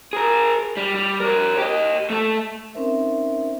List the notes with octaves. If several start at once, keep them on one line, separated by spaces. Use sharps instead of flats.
G#4 A#4
G3
G3
A#4 C#5
G4 D#5
A3 A4
C4 C#4 D#4 A#4 C5 E5